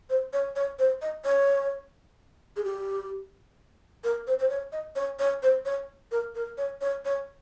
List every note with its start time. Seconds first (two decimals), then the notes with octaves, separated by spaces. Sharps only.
0.10 C5
0.33 C#5
0.56 C#5
0.79 C5
1.02 D#5
1.25 C#5
2.57 G#4
2.64 G4
4.04 A#4
4.27 C5
4.39 C5
4.50 C#5
4.73 D#5
4.96 C#5
5.19 C#5
5.43 C5
5.66 C#5
6.12 A#4
6.35 A#4
6.58 C#5
6.81 C#5
7.05 C#5